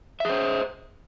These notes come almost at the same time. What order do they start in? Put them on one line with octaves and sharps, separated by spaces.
E5 G#4 C5